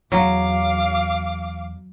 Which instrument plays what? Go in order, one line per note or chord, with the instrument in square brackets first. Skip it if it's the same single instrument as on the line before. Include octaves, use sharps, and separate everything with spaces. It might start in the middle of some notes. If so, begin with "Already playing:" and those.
[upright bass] E2 [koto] F#3 [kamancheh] F5 D6